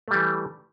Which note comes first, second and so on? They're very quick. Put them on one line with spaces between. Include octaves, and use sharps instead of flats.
A3 G3 E3